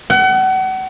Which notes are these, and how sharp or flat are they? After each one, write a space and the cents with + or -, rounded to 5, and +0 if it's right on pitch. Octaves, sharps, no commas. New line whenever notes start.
F#5 +35